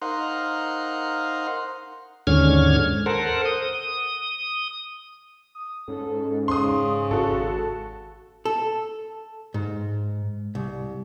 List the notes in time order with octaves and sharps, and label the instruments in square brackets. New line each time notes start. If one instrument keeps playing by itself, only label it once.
[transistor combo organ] D#4 A#4 C5 F5 F#5 C6
[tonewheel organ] D#2 G#2 D3 C#4 F6 G#6
A4 A#4 C5 F#5
D#6
[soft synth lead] D#6
[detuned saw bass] G#2 [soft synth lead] C#4 [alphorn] A4
[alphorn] C#3 [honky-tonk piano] C6 D#6
[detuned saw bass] G#1 [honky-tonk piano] F#4 A4 [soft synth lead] A5
[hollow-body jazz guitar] A4
G#2
C2